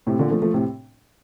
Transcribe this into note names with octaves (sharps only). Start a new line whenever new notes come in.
A2 C3
A#2 D3
F3 A3
F3 A3
A2 C3